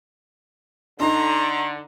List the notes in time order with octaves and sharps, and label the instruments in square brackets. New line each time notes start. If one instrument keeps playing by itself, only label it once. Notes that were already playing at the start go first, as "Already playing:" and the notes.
[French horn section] D3 [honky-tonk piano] D4 D#4 [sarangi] A#5 [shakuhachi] C6